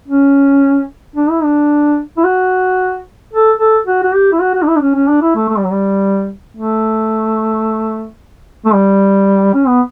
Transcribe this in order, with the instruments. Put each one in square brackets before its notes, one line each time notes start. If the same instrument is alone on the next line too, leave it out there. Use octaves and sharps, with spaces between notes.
[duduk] C#4
D4
E4
D4
E4
F#4
A4
A4
F#4
F#4
G4
E4
F#4
F#4
D4
E4
D4
C#4
C#4
D4
E4
A3
A3
G3
F#3
G3
A3
A3
G3
C#4
B3